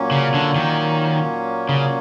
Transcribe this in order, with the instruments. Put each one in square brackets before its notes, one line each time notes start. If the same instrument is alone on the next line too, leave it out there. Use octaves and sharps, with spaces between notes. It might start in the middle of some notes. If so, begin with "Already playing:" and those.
Already playing: [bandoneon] A#2 F#3 A#3 C#4
[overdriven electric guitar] C#3
D3
D#3
C#3